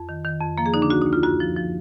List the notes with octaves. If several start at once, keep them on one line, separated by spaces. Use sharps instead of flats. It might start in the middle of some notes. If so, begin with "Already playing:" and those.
Already playing: F2
D#3
D#3
F2
F3 A#3
G#4
D3 D#4
D4
D2 F#4
D#4
D2
F4
F#2 F#4
F3
F3